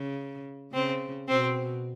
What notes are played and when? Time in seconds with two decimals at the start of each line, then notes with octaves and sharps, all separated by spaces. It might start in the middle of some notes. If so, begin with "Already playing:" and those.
Already playing: C#3
0.73 C#3 C4
1.28 B2 C4